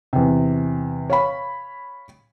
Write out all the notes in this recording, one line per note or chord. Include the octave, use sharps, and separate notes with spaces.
E2 C3
C#5 F5 B5